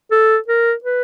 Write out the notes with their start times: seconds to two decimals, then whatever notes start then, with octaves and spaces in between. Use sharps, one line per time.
0.11 A4
0.48 A#4
0.84 B4